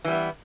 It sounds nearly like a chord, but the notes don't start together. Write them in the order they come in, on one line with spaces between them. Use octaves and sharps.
E3 G3 B3